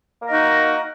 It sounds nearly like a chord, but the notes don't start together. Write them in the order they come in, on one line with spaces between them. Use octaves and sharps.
A#3 A#4 D#5 D#4 F#4